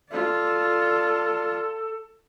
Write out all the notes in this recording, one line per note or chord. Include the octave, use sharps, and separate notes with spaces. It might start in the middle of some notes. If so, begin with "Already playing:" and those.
F4 A4 D5